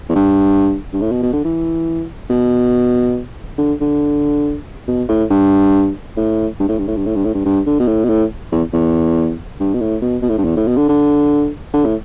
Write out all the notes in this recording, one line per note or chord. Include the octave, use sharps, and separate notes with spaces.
E2
G2
G2
A2
B2
B2
D3
E3
B2
D3
D3
B2
A2
G2
A2
G2
A2
G2
A2
G2
A2
G2
A2
G2
G2
D3
B2
A2
B2
A2
E2
E2
G2
B2
A2
B2
B2
A2
G2
E2
A2
B2
D3
D3
D3
A2